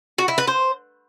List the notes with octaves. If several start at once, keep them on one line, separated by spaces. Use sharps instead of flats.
F#4
E4
B4
C5